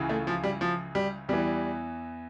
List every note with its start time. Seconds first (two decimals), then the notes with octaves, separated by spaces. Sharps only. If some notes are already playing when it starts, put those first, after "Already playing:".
Already playing: C#2 C#3 E3
0.09 A3
0.27 F3
0.44 G3
0.61 F3
0.95 G3
1.29 E2 E3 G3